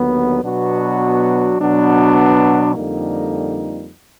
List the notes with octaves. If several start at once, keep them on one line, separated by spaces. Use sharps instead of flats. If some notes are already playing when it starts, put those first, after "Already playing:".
Already playing: D#2 D3 F#3 B3
B2 F#3 B3 D4 F#4
B2 F#3 B3 D4
F2 D3 G3 A#3 D#4